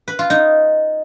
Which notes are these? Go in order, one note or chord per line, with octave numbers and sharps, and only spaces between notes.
B4
F4
D#4